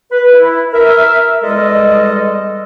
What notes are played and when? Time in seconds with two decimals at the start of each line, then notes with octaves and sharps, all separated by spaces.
0.11 B4
0.33 E4
0.73 A#4 E5
1.43 E2 G3 G#3 A4 D#5